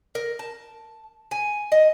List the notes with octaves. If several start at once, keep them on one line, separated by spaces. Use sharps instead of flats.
A#4
A5
G#5
D#5